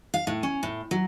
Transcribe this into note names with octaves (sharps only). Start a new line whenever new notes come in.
F5
A2
C#4
A2
F#3